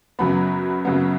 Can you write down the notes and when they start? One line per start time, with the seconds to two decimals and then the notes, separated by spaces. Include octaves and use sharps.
0.19 F#2 C#3 F#3 B3 B5
0.85 F#2 C#3 F#3 B3